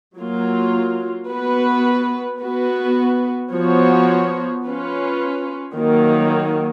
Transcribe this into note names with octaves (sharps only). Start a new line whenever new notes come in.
F#3 A#3 F4
B3 F#4 B4
B3 F#4 B4
F3 B3 F#4 C#5
C#4 F4 B4
D#3 F#3 A#3